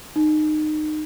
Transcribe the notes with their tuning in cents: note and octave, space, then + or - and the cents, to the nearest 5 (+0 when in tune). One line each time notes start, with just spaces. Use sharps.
D#4 -25